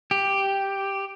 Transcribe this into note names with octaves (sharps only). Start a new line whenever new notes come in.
G4